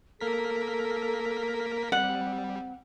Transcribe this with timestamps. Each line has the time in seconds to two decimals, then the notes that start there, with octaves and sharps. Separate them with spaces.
0.21 A#3 A4 A#4 B6
1.92 G3 C4 F#5